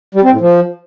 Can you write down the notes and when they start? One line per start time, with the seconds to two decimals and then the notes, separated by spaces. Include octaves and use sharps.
0.15 G3
0.23 C4
0.32 A2
0.41 F3